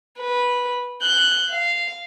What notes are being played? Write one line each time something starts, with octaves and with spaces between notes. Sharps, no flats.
B4
F#6 G6
F5